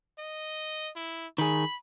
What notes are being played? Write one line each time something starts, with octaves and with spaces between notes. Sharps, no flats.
D#5
E4
D#3 G#4 B5